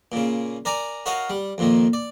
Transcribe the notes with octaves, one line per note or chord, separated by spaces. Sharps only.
A#2 C#3
A#4 D5 G#5 A#5
F#4 A#4 C#5 D#5 F5
G3
F2 A#2 D#3
D5